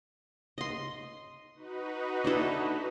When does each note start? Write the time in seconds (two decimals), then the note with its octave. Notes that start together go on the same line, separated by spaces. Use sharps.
0.58 D#5 C6
1.55 D#4 F#4 B4
2.24 D4 E4 A4